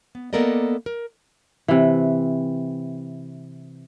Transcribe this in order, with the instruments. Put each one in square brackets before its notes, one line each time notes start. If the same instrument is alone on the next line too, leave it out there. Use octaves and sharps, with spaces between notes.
[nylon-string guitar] B3
A#3 B3 A4 A#4 D5 D#5
A#4
[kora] C3 E3